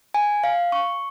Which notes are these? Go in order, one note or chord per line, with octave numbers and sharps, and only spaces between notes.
G#5
F5
C#6